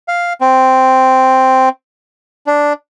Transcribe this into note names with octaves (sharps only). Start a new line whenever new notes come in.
F5
C4
D4